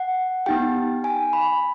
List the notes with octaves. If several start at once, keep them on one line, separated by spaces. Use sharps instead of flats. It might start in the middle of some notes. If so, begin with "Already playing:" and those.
Already playing: F#5
B3 D#4 G4 G5
G#5
B5